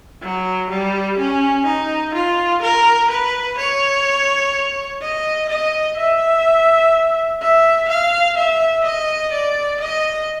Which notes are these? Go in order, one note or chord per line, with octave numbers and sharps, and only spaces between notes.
F#3
G3
C#4
D#4
F4
A#4
B4
C#5
D#5
D#5
E5
E5
F5
E5
D#5
D5
D#5